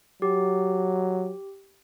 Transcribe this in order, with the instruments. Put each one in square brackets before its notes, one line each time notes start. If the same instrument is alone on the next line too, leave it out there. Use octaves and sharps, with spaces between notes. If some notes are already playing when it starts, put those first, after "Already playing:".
[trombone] F#3 [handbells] G4